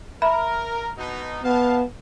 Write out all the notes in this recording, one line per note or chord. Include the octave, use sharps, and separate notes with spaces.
A#4 E5 B5
B2 B3 D#4
B2 B3 F5 A5